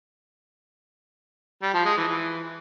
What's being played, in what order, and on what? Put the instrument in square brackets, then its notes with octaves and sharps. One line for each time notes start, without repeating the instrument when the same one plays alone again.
[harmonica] G3
F3
G#3
E3
E3